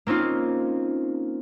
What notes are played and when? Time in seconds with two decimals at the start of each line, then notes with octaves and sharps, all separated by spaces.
0.07 A#3 C4 C#4 D#4 F4